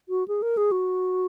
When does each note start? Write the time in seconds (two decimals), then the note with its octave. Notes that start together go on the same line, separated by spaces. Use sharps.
0.09 F#4
0.28 G#4
0.42 A#4
0.57 G#4
0.72 F#4